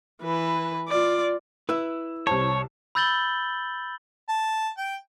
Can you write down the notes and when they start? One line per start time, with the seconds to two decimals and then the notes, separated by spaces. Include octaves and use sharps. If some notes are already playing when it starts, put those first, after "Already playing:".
0.22 E3 B4
0.88 F4 D5
1.69 E4 B4 E6
2.27 C2 C5 C#5 A5
2.95 B5 E6 G6 A6 F#7 G7
4.29 A5
4.78 G5